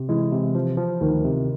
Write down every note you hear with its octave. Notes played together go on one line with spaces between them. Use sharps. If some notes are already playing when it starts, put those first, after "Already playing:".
Already playing: C3
E3 G#3
C3
F3
F3
D2 D#3
C3